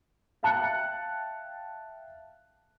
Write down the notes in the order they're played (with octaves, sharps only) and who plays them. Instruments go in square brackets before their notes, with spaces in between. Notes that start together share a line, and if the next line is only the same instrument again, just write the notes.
[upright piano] E5 F5 G5 A5 F#6 C#7